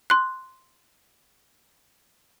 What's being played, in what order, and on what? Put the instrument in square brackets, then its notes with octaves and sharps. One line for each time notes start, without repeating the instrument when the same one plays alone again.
[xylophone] C6 F#6